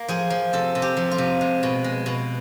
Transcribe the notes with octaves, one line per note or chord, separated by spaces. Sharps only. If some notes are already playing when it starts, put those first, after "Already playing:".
Already playing: A#3
F3 G#4
F3
C3 A4
C3
G4
F3
F4
C3
G#3
B2
G#3
B2